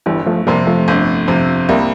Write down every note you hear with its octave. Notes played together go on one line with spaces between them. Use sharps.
G1 E3 G3
F3 A3
F2 C3 G3 A#3
F3 A3
G1
F2 C3
C2 G3 A#3